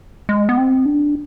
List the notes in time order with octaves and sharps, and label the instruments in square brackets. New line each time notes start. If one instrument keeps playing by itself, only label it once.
[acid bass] G#3
B3
C4
D4